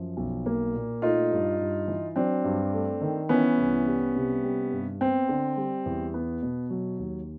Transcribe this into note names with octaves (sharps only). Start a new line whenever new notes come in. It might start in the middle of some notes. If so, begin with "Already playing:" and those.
Already playing: F#2 F3
B1
A#3
A#2
A3 D#4 F4
G2
G2
E3
F#3 C4 D4
G2
A3
D#3
E3 B3 C#4
C2
G3
C3
G3
G2
B3 C4
D3
G3
E2
B3
B2
F#3
D#2